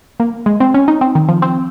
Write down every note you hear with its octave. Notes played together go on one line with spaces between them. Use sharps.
A#3
G#3
C4
C#4
D#4
C4
D#3
F3
C4